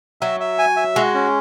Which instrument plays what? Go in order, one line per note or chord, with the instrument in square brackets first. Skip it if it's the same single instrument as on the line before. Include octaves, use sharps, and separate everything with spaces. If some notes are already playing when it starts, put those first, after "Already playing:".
[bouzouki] F#3 [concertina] E5
[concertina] E5
G#5
E5
[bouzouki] G#3 [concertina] F#4
[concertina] C#4